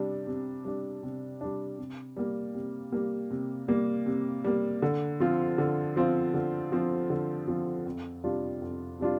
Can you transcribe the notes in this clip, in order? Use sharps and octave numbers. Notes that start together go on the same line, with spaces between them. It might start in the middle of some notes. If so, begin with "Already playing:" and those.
Already playing: C3 G3 D4
C3
G3 D4
C3
G3 D4
C3
G3 A#3
C3
G3 A#3
C3
G3 A#3
C3
G3 A#3
D3
F3 C4 F4
D3
F3 C4 F4
D3
F3 C4 F4
D3
F3 C4 F4
F2
C3 G3 D4 F4
F2
C3 G3 D4 F4